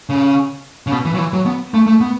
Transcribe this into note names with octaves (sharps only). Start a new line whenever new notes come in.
C#3
C#3
B2
E3
F#3
E3
F#3
B3
A3
A3
B3